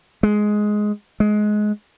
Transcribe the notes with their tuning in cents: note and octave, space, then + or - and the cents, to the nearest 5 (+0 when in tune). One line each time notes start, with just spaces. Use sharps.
G#3 +10
G#3 +20